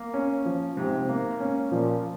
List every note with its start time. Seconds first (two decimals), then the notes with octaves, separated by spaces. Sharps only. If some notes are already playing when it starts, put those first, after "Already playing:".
Already playing: A#3
0.14 C#4
0.46 F3
0.77 G#2 C3
1.09 A#3
1.40 C#4
1.72 A#2 F3